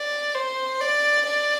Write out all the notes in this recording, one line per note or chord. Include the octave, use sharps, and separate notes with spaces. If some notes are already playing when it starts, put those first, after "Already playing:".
Already playing: D5
C5
D5
D5